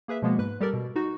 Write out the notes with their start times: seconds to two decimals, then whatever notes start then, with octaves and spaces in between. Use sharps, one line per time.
0.08 A#3 G#4 B4 E5
0.22 B2 F3 G#3 A#3 B3
0.38 G#2 B4 F#6
0.60 G3 G4 A4 A#4 D5
0.73 B2
0.96 D#4 F#4